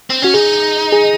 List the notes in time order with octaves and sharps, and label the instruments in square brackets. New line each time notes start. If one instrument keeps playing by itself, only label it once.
[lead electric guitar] C4
[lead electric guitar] C#4 [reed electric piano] F#4
[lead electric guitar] D#4 [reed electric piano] G#4
[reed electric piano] G#4